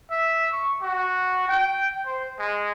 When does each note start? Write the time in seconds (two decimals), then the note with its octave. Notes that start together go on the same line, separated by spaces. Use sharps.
0.10 E5
0.52 C#6
0.82 F#4
1.48 G5
2.06 C5
2.39 G#3